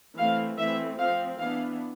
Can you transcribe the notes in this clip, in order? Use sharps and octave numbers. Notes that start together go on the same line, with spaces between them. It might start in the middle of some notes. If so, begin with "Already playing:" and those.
E3 A3 C4 F5
E3 A3 C4 E5
F3 C4 F5
E3 B3 D4 F5